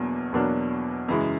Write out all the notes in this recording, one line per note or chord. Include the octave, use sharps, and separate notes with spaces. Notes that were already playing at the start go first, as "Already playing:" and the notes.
Already playing: E2 B2 F#3 A#3 D4
E2 B2 F#3 A#3 D4
F#2 C#3 E3 G#3